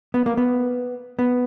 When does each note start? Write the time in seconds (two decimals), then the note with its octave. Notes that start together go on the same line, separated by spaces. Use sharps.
0.14 B3
0.26 A#3
0.37 B3
1.19 B3